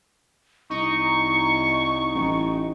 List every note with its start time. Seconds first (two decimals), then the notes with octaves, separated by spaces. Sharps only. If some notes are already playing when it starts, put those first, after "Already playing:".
0.70 C2 D#4 C#6
2.15 A1